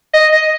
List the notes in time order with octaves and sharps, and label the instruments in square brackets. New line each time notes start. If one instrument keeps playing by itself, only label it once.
[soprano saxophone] D#5
D#5